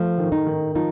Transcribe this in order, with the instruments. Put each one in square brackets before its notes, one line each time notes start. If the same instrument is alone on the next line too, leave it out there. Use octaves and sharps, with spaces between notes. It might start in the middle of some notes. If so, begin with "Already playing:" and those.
Already playing: [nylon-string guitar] F3 [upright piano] A3
[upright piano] D#3
[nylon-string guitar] D#4
[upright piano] D#3
[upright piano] F3 [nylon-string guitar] D#4